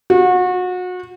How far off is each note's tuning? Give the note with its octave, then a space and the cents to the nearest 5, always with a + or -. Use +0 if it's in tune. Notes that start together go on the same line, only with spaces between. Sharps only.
F#4 -30